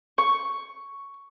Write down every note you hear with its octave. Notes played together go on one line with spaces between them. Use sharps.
C#6